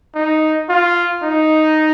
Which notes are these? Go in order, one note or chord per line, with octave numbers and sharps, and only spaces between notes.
D#4
F4
D#4